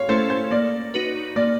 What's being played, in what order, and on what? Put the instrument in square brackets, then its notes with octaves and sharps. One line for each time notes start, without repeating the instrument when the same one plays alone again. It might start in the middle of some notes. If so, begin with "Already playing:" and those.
Already playing: [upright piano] C#5 F5
[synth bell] A3 C#4 E4 A4 [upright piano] C5
[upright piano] C5
[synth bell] A#3 [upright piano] D5
[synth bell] D#4 F#4 B4
[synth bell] A#3 [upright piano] D5